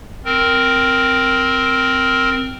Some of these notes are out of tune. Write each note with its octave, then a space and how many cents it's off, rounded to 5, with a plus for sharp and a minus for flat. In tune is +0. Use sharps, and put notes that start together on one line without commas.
C4 -5 A#4 +0